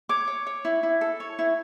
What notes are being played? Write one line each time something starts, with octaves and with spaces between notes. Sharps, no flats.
C#5 D6
C#5
C#5
E4
E4
A4
C#5
E4